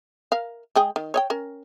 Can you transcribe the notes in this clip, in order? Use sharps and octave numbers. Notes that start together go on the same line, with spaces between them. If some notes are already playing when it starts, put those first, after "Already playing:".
A#4 F5
G#3 G#4 G5
D#3
C#5 D#5 G5
C#4 A#4